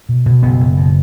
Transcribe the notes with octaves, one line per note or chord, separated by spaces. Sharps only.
B2
B2
F#1 B3
F#1
B2